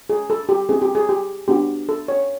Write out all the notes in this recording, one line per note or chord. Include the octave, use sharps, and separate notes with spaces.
G#4
A4
G4
C4 E4 G4 G#4
G4
G#4
G4
B3 D4 F#4 G4
A4
C#5